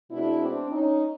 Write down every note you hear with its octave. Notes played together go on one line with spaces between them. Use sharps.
B2 G#3 C4 D4 E4
C4 D4
C#4 D#4